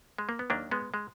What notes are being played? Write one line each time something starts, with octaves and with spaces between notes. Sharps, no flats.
G#3
A#3
B3
D#2 D#3 F#3 A#3 D4
G#3 B3
G#3